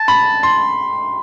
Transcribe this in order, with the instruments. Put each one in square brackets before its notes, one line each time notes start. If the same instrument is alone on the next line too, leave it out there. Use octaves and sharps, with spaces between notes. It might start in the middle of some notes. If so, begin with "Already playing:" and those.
Already playing: [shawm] A5
[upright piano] B5
C6